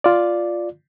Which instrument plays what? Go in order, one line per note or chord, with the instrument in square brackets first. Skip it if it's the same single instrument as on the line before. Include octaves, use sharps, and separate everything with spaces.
[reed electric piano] F4 D5